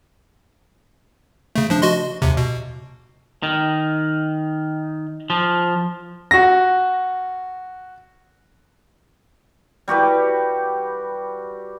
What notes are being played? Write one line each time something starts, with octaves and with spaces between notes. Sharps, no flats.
C#3 A3
F3 D4
F#4 D#5 C6
D#2 C3
B2
D#3
F3
F#4 A#6
G3 F#4 G4 B4